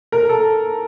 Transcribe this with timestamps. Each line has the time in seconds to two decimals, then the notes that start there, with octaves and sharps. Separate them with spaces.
0.12 A#4
0.29 A4